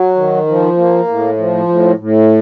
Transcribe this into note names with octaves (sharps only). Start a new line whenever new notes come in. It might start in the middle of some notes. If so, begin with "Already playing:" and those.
Already playing: F#3
D#3
F3
A#3
A2
F3
A2
A2